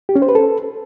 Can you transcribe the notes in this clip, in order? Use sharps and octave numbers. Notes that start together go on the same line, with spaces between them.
G4
C#4
C5
B4
A4